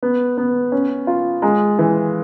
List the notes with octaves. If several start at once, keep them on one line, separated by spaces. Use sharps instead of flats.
B3
B3
C#4
F4
G#3
E3